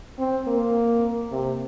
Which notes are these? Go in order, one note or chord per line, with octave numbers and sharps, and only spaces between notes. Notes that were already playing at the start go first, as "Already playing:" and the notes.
C4
A#3
C3